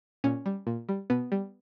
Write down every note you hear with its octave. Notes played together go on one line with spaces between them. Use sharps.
A#2 C#4
G3
A#2
G3
B2 B3
G3